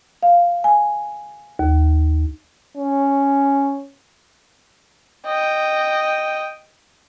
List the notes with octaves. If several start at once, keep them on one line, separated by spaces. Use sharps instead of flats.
F5
G#5
D#2
C#4
D#5 G5